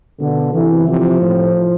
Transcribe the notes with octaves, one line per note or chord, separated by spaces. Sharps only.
B2 D3
C3 E3
C3 F3
A2